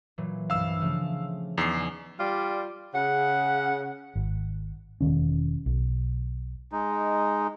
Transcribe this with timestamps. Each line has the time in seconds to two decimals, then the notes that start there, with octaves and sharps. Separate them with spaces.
0.18 A#2 E3 F#3
0.50 C2 G2 F5 E6
0.81 C#3 F3 A3
1.58 E2 D#4 G#5 D6 C7
2.20 G3 F4 D5
2.94 C#3 F#5
4.15 G#1
5.01 E1 D#2 D#3 C#4
5.66 B1
6.72 G#3 D#4